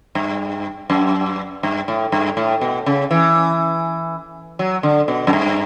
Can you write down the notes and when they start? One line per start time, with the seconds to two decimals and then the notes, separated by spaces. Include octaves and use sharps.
0.15 G2
0.90 F#2
1.63 G2
1.88 A2
2.12 G2
2.37 A2
2.61 B2
2.86 C#3
3.11 E3
4.59 F#3
4.83 D3
5.08 B2
5.27 F#2
5.33 G2